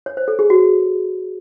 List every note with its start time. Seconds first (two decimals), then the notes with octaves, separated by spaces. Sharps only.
0.06 C#5
0.17 C5
0.28 A4
0.39 G#4
0.50 F#4